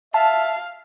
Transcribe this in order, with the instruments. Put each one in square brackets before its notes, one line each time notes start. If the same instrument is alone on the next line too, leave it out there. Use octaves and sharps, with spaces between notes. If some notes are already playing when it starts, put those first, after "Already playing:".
[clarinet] E5 [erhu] F5 [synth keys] A5